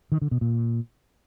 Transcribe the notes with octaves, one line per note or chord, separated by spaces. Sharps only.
D#3
D3
B2
A#2